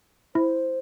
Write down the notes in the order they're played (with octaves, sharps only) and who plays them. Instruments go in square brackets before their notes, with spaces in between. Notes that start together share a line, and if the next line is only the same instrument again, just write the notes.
[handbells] E4 [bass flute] C5